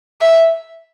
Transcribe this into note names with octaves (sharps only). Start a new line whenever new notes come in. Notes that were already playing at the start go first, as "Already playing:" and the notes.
E5